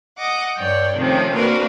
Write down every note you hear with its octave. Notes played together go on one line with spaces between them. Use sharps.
D#5 F#5 D6
G2 C#5 D5 G5
C3 D#3 F3 A3 C4 C#4
A#3 C4 D4 F#4 A#4 B4